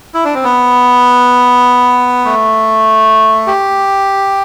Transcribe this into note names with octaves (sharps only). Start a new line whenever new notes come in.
E4
D4
C4
B3
A3
G4